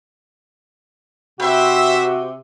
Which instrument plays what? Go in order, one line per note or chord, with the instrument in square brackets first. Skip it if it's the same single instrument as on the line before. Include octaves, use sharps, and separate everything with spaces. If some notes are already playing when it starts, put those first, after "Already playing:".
[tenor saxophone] C3 [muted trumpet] F#4 [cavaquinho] B4 G5 [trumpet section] C5 E5